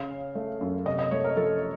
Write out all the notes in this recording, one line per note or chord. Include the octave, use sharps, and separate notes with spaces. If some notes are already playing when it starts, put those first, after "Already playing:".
Already playing: C#3 F5
C#4
A3
F#2
C3 D#5
D#5
A3 C#5
A#4
F3 A4